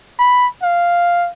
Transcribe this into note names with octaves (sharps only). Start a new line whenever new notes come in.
B5
F5